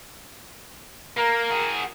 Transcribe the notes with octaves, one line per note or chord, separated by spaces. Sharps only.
A#3 A#4
F#4 G#4